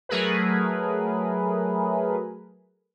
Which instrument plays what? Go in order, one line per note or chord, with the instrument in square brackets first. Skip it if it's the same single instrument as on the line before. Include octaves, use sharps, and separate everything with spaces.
[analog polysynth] F#3 A3 G#4 A#4 B4